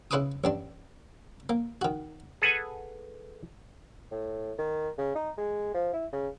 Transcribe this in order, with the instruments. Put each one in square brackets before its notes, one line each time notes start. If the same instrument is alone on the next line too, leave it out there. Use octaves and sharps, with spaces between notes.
[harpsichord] C#3 E4 B4 C6 D6 D#6
A1 G2 D4
A#3
D#3 F#4
[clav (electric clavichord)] G#4 A4 B4 F#5 G#5
[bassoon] A2
D#3
C#3
D#4
G#3
F3
E4
C#3